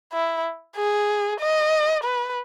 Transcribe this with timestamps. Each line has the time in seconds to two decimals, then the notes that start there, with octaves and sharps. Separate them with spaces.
0.13 E4
0.76 G#4
1.40 D#5
2.04 B4